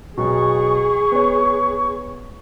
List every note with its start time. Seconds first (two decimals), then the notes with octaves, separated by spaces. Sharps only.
0.18 B1 B2 G#4 C#6
1.12 B3 C#5